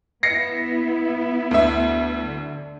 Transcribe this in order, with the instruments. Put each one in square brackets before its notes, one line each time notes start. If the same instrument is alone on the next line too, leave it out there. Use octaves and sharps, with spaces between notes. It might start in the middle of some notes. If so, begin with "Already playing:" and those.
[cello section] B3 E4 [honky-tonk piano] A#6 C7 C#7
[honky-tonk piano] D2 E5
[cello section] D3